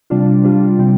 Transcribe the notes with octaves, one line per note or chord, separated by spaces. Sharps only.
C3 G3 D4 F4
C3 G3 D4 F4
C3 G3 C4